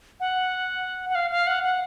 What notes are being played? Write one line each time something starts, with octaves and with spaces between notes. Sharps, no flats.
F#5
F#5
F5
F5
F#5
F#5